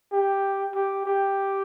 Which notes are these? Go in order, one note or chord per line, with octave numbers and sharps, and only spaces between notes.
G4
G4
G4